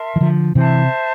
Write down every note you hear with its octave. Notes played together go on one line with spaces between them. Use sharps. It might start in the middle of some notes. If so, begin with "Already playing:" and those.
Already playing: A#4 E5 A5 C6
E3
D3 F3
C3 E3 C5 E5 A5